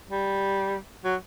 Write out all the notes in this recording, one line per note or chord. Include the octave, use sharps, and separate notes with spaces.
G3
F#3